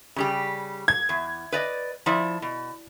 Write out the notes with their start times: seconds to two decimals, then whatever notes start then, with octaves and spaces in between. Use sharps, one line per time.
0.16 C#3 G3 G4
0.88 G#6
1.09 E2
1.52 B4 D5 D#5
2.06 F3 E4 D5
2.42 B2